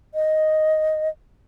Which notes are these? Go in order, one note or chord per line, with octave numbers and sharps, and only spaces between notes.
D#5